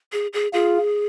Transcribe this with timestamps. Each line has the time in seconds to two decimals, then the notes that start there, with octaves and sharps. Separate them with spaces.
0.13 G#4
0.34 G#4
0.53 F4 G#4